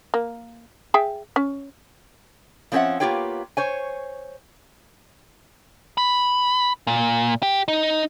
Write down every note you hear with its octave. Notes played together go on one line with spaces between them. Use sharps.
A#3
G#4 E5 G5
C#4
F3 C4 C#4 A4 E5 F#5
A#3 B3 F4 G4 C#5 G5
C5 C#5 G#5
B5
A#2
G4
D#4